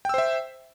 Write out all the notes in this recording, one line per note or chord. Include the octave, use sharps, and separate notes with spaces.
C5 E5 G5 E6